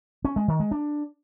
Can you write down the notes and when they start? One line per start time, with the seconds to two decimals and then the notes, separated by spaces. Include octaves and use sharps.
0.25 C#4
0.36 G#3
0.48 D#3
0.60 G#3
0.71 D4